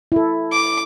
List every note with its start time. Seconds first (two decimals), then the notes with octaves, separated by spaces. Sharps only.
0.12 E4 A4
0.52 D6